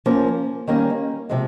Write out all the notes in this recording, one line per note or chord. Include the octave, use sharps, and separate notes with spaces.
F3 A#3 C#4
D#3 G3 A#3 C#4
C3 F3 G#3